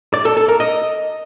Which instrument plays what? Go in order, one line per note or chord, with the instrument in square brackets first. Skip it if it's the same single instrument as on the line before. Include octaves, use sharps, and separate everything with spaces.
[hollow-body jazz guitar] D5
A4
A4
A#4
D#5